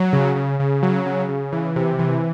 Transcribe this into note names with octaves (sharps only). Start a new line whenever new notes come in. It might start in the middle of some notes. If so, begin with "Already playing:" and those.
Already playing: F#3
C#3
C#3
C#3
F#3
C#3
C#3
E3
C3
E3